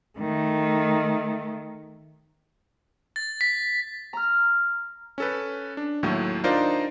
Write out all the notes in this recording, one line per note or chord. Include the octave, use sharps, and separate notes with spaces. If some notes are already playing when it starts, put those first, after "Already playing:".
D#3 A3
A6
B6
A#5 F6
C#4 A4 B4
D4
D#2 A2 F#3 A3
D4 D#4 F4 A#4 C5 D5